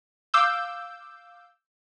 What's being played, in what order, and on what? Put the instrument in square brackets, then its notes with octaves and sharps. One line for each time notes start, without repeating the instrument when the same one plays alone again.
[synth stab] F5 D6 E6 G6